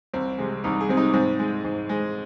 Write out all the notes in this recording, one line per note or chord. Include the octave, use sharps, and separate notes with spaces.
C2 C4
C3 G#3
C2 D#4
G#4
C3 G#3 C4
D#4
G#2 C4
G#3
G#2
G#3